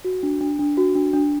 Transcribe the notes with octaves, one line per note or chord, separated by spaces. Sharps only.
F#4
D4
D4
D4
F#4
D4
D4